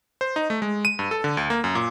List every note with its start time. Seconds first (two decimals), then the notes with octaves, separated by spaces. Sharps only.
0.21 C5
0.36 D#4
0.50 A3
0.62 G#3
0.85 D#7
0.99 G2
1.11 A4
1.24 D3
1.37 D2
1.50 A#3
1.64 F#2
1.75 A#2